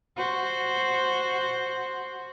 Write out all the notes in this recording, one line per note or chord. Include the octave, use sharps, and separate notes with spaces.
F#4 C5